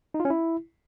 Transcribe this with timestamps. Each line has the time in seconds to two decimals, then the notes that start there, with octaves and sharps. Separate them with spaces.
0.14 D#4
0.20 F4
0.25 C#4
0.30 E4